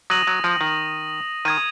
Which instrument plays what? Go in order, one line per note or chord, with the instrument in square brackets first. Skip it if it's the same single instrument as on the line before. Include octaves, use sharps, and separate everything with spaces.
[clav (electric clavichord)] F#3 [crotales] D#6 A#6 D#7 F#7
[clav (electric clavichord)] F#3
F3
D#3
[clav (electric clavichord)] D#3 [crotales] D#6 G#6 D#7